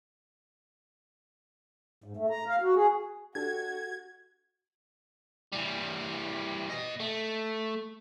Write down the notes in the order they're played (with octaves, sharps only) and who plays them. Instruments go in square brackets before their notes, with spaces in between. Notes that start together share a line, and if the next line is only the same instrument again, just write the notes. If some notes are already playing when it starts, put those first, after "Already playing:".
[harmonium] G#2
A3
A#5
F5
F#4
G#4
[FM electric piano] D4 G4 A4 [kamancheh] F#4 [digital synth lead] G#6
[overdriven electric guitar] E3 G3
B2 D#5
A3